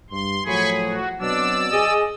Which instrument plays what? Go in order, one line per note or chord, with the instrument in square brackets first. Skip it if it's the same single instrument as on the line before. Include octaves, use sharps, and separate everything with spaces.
[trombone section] G2 [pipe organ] C6
[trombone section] A2 F3 F#3 [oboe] G#4 [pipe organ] G#5 B5 C#6
[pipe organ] F#4
[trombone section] B2 F#3 C4 [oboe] D4 [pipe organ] D5 E6
[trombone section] G#4 [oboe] D#5